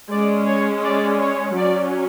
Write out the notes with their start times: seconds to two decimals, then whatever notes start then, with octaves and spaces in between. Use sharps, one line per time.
0.12 G#3 C#4 D5
0.48 C#5
0.85 D5
1.21 C#5
1.58 F#3 C#4 D5